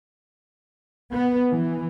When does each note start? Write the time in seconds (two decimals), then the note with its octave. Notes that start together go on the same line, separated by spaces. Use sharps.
1.12 B3
1.54 E3